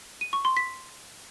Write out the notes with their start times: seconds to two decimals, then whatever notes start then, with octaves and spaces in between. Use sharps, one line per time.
0.21 D#7
0.33 C#6
0.45 C6
0.57 B6